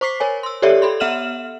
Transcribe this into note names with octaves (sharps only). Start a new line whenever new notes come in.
C5 C#6 D6 B6 C7
A#4 C#5 G#5
C6 E6
G4 A4 C#5 D5 E5
A4 B5 C6
B3 E5 F#5 F6 E7 F#7